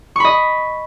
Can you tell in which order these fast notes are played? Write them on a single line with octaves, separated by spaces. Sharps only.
C#6 B5 D#5